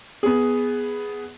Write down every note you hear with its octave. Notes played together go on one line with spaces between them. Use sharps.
B3 G#4